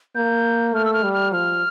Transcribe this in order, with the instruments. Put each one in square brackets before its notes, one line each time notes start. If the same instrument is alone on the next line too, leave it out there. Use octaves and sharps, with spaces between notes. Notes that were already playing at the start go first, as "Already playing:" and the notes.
[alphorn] A#3 [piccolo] G6
[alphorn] A3 [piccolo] F6
[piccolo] E6
F6
[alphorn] G3
[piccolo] F6
[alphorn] F3 [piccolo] F6